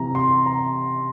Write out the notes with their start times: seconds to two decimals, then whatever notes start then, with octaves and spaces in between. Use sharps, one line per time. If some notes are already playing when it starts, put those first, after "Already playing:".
Already playing: C3 E3 A#5
0.15 C6
0.46 A#5